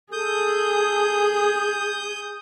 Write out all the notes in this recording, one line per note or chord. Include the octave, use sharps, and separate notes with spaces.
G#4 A4 D#6 G6